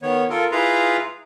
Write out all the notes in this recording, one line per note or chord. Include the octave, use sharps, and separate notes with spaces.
D#3 B3 C#5
F4 A4 A#4
E4 F4 G#4 B4 F5 A#5